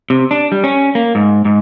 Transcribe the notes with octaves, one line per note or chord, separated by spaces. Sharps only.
C3
D4
G3
C#4
A#3
G#2
G#2